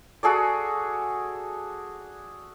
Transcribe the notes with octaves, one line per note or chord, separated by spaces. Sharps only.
F#4 G#4 A4 D5